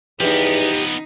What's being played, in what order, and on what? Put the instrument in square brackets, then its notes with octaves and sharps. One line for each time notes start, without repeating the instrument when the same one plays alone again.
[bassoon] E2 [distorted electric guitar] F3 B3 [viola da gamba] D#4 [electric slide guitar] G4